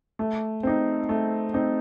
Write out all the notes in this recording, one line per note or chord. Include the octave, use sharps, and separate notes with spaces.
A3
C4 D#4
A3
C4 D#4